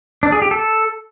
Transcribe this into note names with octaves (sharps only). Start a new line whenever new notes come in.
D4
G#4
G4
A4